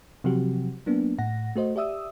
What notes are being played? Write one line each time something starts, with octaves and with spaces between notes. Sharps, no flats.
C3 F3 F#3 C4 F#4 G4
F#3 A#3 B3 D4
A2 F#5 A#6
A3 F#4 C5 D#5
G4 D5 E5 D#6 E6